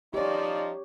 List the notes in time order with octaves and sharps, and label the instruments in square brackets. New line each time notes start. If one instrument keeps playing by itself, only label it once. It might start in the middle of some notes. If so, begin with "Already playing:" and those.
[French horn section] F3 D#4 [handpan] G4 C#5 [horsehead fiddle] D5